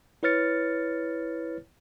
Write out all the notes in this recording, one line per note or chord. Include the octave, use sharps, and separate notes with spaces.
E4 B4 C#5 F6 A6 C#7